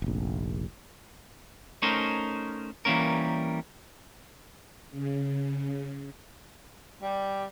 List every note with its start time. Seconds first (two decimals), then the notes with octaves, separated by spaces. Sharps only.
0.02 F1 A#1
1.82 A3 C#4 D#4 A#4 C5
2.85 E3 G3 A#3 C#4 A#4
4.91 C#3
7.01 G3